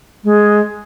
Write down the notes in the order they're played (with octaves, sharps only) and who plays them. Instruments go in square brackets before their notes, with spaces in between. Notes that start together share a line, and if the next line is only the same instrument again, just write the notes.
[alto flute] G#3